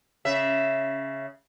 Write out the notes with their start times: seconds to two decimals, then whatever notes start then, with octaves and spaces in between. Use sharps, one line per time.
0.25 C#3 E5